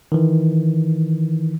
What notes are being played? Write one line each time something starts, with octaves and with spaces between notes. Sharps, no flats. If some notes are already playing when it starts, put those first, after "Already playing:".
D#3 E3